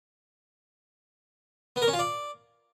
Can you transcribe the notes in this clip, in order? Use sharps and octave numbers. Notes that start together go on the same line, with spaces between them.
B3
A#4
C#4
F4
D5